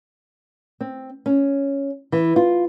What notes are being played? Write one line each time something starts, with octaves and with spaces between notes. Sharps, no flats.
C4
C#4
E3
F4